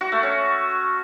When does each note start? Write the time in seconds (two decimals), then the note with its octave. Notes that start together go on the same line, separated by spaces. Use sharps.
0.01 F#4
0.12 A3
0.23 C#4